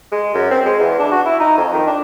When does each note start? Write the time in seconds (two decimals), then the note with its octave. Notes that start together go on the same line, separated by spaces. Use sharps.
0.12 G#3
0.35 F#2
0.51 C4
0.66 G#3
0.80 E2
0.99 D4
1.12 F#4
1.26 E4
1.40 D#4
1.58 F2
1.74 D#3
1.87 D4